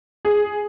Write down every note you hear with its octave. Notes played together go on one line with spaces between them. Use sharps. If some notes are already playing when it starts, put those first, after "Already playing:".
G#4